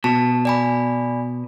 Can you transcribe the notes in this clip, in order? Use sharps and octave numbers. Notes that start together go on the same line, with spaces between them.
B2 A5
D5 G#5 B5